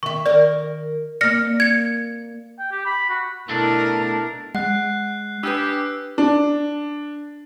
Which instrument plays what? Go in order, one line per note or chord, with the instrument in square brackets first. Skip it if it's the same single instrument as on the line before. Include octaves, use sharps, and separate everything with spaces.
[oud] D#3 E5 [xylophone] C#6
[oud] D#3 A#4 [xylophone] D5
[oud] A#3 D5 [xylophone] F6 A#6 C#7
[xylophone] G#6 C#7
[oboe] G5
G4
B5
F#4
[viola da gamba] B2 E4 A#4 [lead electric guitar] A3 D4
[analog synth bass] G#3 [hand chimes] F#5 [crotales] F#6 C7
[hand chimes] D4 B4 [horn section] G4 [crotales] E6
[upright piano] D4